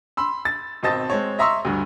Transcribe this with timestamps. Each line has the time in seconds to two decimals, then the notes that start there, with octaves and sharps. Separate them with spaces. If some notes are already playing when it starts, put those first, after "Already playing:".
0.17 B5 C6 E6
0.45 A6
0.83 G#1 B2 C4 D#5 A5 A6
1.10 G#3 C4 C#5
1.39 D#5 E5 A#5 C6 C#6 E6
1.65 D2 G2